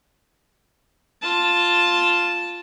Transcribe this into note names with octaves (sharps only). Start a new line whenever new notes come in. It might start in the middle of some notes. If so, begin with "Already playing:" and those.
F4 A5